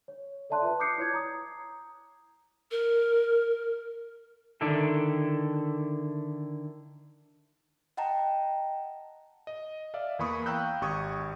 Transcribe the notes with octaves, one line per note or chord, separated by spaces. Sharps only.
C#5
A4 D5 E5 A5 C6 F#6
F4 B4 A5
D6 D#6 F#6 G6 C7 C#7
E4 C#5 G#6
A#5 D#6
A#4
D3 D#3 D4 E4 A4
D#5 F#5 G5 A5 A#5
D#5
D5 E5 F5
E2 E3 A#3 B5 C#6 D#6
F5 G5 A#5 E6 F#6 G6
G#1 G4 C#6 D#6 G#6